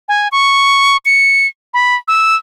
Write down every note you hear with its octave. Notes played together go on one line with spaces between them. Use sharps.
G#5
C#6
C#7
B5
E6